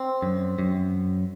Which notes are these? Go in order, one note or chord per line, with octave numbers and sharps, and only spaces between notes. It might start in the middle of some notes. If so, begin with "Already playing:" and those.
Already playing: C4
F#2
F#2